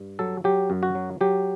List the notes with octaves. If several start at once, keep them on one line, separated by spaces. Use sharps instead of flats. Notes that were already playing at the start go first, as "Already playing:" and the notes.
Already playing: G2
F#3 A4
F#3 G4
F#2
F#4
F#3
F#3 G4